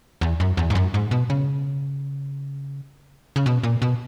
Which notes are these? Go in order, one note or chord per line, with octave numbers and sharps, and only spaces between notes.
E2
F#2
E2
G#2
F#2
G#2
B2
C#3
C#3
B2
A#2
B2